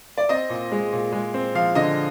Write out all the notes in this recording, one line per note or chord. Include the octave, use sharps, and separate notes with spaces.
D5
C4 D#5
A#2
G#3
A#2
G#3
C4
F3 F5
D3 D#5